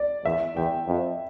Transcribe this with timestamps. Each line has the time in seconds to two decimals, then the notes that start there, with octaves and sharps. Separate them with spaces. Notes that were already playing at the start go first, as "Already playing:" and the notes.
Already playing: D5
0.24 E2 E5
0.56 E2 G5
0.88 F2